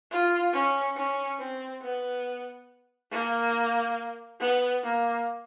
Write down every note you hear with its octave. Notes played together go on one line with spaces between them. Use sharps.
F4
C#4
C#4
C4
B3
A#3
B3
A#3